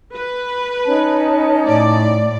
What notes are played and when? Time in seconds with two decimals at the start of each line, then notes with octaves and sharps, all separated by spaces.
0.15 B4
0.85 C#4 D#4 A5
1.65 A2 D5